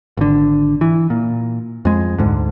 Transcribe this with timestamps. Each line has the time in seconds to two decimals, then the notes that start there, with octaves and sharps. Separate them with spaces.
0.17 G#1 D3
0.81 E3
1.10 A#2
1.85 F2 G#3
2.18 D2 G#2 D3